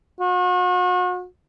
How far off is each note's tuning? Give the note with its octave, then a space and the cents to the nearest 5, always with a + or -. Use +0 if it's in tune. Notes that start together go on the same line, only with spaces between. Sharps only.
F#4 -40